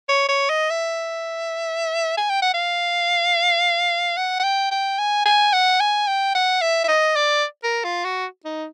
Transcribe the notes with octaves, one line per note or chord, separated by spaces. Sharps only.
C#5
C#5
D#5
E5
G#5
G5
F#5
F5
F#5
F#5
G5
G5
G#5
G#5
F#5
G#5
G5
F#5
E5
E5
D#5
D5
A#4
F4
F#4
D#4